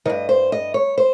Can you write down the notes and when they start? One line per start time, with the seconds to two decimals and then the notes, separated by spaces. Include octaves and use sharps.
0.05 G2 D#3 D#5
0.29 C5
0.52 D#5
0.74 C#5
0.97 C5